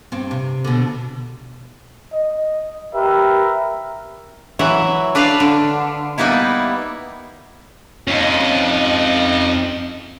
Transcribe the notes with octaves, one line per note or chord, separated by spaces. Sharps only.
G2 C4
C3
B2 D3
D#5
G4 A#4 B4 E5
E3 F#3 E5 F#5
D4 B4 D5 F5
D3
G3 A#3 B3 D#4 E4
F2 C#4 D#4